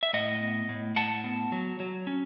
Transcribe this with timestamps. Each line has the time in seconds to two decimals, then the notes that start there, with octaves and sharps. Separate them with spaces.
0.03 E5
0.13 A2 D#5 F#5
0.41 B3
0.69 A2
0.96 A2 F#5 A5
1.24 B3
1.52 F#3
1.80 F#3
2.07 C#4